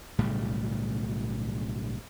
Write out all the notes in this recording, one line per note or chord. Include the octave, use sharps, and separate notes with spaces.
B1 A2 C#3 G3